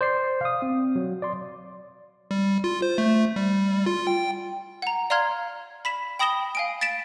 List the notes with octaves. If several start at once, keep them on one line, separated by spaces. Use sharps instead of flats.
C5 D5 C7
F5 D#6
C4
F#3
D5 C6
G3
F4
C5
A3
G3
F4
G5
F#5 A#5
D5 F5 A#5 C6 F6 G#6
B5 B6 E7
G5 B5 D#6 A#6 E7 G7
F5 G#5 D7
A6 B6 D7 E7